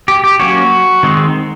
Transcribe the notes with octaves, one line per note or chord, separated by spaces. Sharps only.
G4
G4
F#3 A#3 C#4 F#4
D#3 G#3 C4